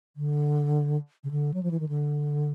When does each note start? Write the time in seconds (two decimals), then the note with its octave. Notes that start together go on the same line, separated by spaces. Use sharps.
0.16 D3
1.24 C#3
1.31 D3
1.54 F#3
1.63 F3
1.71 E3
1.80 D#3
1.89 D3